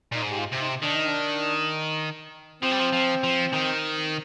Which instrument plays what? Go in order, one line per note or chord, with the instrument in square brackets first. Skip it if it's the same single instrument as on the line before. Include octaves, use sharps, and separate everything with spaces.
[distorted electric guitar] A#2 [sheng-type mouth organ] D#4
[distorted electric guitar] G#2
[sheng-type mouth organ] G4
F4
[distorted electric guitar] C3
[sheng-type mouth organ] D#4
[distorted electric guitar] D#3 [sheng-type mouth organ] D4
[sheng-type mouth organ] D#4
D4
[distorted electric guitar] F3 [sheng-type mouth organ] C4
[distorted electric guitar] G3
F3
F3
F3
D#3